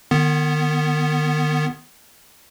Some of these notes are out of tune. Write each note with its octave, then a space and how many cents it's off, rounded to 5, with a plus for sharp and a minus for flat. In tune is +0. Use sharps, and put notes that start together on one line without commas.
D#3 -40 B3 +0